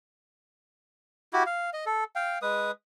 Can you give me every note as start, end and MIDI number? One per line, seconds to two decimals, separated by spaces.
1.33 1.43 64
1.33 1.43 66
1.33 1.43 67
1.46 1.70 77
1.73 1.85 75
1.86 2.04 69
2.16 2.39 77
2.16 2.39 79
2.42 2.71 56
2.42 2.71 71
2.42 2.71 87